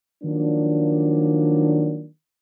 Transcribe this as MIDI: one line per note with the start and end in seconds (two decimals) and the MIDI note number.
0.23 2.05 51
0.23 2.05 53
0.23 2.05 54
0.23 2.05 58
0.23 2.05 62